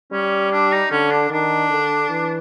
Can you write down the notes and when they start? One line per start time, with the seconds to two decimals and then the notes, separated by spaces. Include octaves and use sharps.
0.11 G3 C#4
0.52 D4
0.72 D#4
0.90 D3 C#4
1.11 D4
1.30 D#3 D4
1.71 D3
2.10 E3